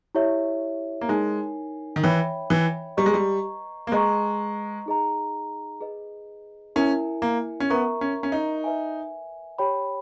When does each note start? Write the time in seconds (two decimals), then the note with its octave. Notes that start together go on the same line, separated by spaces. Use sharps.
0.15 E4 G4 C#5 E5
1.01 A#3
1.08 G#3 D#4 A#4 C#5 G#5
1.96 D#3
2.04 E3 C#5 E5 G5 B5
2.50 E3
2.97 G3 B4 D#5 A#5 C#6
3.06 G#3
3.14 G3
3.87 A#3
3.92 G#3 B4 D#5 A#5 C#6
4.86 D#4 G#4 D#5 A#5
5.81 G#4 B4 D#5
6.76 C#4 E4 A#4 E5 G#5
7.22 A#3
7.60 C#4
7.70 B3 A#4 E5 A#5 C#6
8.01 C#4
8.23 C#4
8.32 D#4
8.64 B4 E5 G#5
9.58 G4 C#5 G5 B5